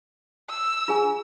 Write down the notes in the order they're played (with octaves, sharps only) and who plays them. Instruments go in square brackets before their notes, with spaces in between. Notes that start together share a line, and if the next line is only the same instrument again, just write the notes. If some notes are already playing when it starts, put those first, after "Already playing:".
[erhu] E6
[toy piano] F4 G#4 G#5